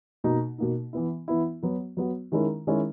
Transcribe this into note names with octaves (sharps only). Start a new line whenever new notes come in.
B2 A#3 D#4
B2 A#3 D#4
E3 B3 E4
E3 B3 E4
F#3 B3 F#4
F#3 B3 F#4
D#3 G#3 C#4 E4 A#4
D#3 G#3 C#4 E4 A#4